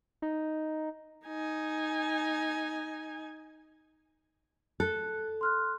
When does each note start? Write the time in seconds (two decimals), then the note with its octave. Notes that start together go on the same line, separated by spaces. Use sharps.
0.22 D#4
1.27 D#4 G#5
4.80 A4 F#6
5.41 C6 F6 F#6